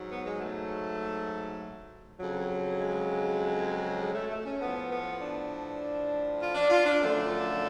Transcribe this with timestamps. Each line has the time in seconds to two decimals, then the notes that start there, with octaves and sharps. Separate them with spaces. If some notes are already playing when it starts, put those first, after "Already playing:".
Already playing: G#2 F#3
0.08 B3
0.24 G#3
0.38 A3
2.18 F2 C#3 F#3
2.79 G#3
4.00 G#3
4.14 A3
4.30 A3
4.45 C#4
4.60 A2 F3 B3
4.90 B3
5.20 D4
6.40 F4
6.55 D4
6.70 F4
6.86 D4
7.00 F#2 D3 F3 A3